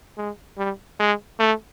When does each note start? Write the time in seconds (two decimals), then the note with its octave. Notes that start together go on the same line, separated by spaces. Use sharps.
0.18 G#3
0.58 G3
1.00 G#3
1.40 A3